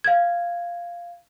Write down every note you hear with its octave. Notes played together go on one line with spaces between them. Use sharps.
F5 G#6